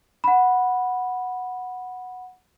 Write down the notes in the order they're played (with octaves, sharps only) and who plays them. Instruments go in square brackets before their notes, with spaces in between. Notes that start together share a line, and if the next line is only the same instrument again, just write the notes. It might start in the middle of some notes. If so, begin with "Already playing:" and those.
[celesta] F#5 B5